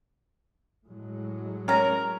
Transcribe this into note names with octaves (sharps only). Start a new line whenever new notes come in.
A2 F#3 G#3
C#4 A#4 A#5